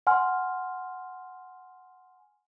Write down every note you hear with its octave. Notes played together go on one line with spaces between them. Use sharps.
F#5 G#5 C6 F6